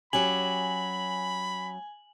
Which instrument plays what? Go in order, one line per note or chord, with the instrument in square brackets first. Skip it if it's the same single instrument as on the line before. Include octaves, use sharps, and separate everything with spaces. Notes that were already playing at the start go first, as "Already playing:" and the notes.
[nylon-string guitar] F#3 C#4 G4 [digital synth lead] G#5 [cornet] B5 [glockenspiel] F#7